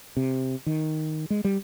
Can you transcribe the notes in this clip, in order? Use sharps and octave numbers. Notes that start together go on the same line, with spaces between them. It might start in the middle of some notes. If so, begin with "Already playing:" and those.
C3
D#3
G#3
G3